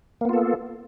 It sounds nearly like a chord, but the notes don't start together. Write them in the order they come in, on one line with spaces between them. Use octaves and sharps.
A#3 B3 F4 A4